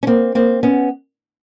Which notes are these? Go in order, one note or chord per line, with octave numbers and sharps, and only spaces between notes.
C#4
A#3 C4
A#3 C4
B3 C#4